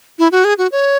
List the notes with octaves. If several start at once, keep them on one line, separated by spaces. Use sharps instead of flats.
E4
F#4
G#4
F#4
C#5